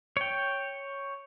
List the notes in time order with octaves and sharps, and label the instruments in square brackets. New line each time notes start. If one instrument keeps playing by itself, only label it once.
[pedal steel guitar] C#5 G5